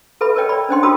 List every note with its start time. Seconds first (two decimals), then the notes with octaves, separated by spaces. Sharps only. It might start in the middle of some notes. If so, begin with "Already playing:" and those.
0.21 A4 B4 E5 B5
0.35 A#4 B4 C#5 D#5 G5
0.49 D5 B5
0.69 C#4 D4 C5 D#5 G5 C6
0.83 F4 F#4 A#4 B5 D#6